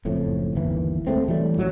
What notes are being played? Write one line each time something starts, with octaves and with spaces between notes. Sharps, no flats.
F#1 F2 A2
G1 D#2 E3
D#2 G#3 A3 C4
E3 F#3 G3 A3
A1 F#3